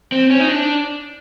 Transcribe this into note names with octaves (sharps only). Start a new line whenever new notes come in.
C4
C#4
D#4
D4